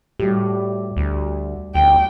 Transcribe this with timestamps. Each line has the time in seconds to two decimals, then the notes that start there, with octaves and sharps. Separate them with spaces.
0.20 A2 G3 F#4 G4
0.97 D2
1.75 D2 G5